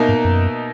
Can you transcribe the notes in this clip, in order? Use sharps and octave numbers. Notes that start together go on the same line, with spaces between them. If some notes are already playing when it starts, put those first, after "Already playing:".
Already playing: B2 A#3 D#4 A#4 E5
G#2
F#2